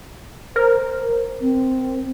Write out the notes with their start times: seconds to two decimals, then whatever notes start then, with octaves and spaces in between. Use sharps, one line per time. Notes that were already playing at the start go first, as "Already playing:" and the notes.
0.56 A#4 C5
1.41 C4